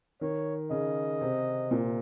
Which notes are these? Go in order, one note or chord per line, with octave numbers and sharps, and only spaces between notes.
D#3 C#5
C#3 D#5
C3
A#2